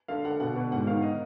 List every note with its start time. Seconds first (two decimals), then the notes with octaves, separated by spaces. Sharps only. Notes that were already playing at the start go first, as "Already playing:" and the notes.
0.08 D3 F5
0.24 D3 F#5
0.40 B2 F#5
0.56 B2
0.71 G#2 F#5
0.87 D#3 F5
1.02 D#5